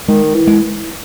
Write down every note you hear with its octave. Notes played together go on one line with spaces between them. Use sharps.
D#3 G#3
E3
G#3